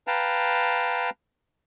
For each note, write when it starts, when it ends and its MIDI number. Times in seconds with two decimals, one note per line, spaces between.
0.07 1.10 71
0.07 1.10 77
0.07 1.10 79
0.07 1.10 81
0.07 1.10 82